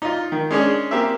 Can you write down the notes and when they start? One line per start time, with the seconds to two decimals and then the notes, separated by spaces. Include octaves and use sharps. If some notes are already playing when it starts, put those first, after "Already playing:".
0.02 D#4 F4
0.32 D#3
0.51 G#3 C#4 D4 G#4
0.91 A#3 C4 G4 E5